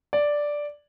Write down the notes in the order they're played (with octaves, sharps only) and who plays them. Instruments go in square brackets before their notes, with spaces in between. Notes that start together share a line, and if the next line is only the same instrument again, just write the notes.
[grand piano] D5